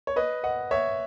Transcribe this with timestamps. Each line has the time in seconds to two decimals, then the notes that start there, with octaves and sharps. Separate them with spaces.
0.07 C#5
0.16 B4 D#5
0.44 D#5 F#5
0.71 C#5 E5